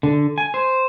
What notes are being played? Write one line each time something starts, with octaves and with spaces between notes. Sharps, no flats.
D3
G#5
C5